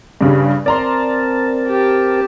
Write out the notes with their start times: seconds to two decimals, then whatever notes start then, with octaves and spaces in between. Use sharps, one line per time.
0.21 G2 C#3 G3
0.66 C4 A#4 D5 A5 A#5 C6
1.67 G4